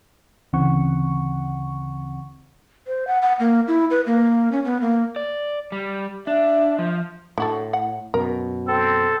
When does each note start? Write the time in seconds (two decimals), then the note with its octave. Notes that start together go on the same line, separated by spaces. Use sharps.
0.53 D2 C#3 E3 C4 F#5 C#6
2.87 C5
3.07 F#5
3.22 F#5
3.40 A#3
3.68 E4
3.91 B4
4.06 A#3
4.52 C#4
4.65 B3
4.81 A#3
5.16 D5
5.72 G3
6.27 D4 E5
6.79 F3
7.38 A2 D3 F#4 A4
7.73 F#5
8.14 F#2 B2 A#4
8.67 C4 A4